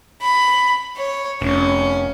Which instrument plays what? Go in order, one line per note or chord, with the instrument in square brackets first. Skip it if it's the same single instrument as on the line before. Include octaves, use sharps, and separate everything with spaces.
[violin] B5
C#5
[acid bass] F1 [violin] C#4